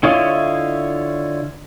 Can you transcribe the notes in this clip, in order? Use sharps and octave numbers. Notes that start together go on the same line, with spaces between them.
D3 E4 F4 C#5 D#5